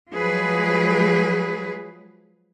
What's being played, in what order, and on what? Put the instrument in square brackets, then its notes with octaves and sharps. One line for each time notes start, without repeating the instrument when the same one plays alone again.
[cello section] F3 F#3 G#3 G#4 B4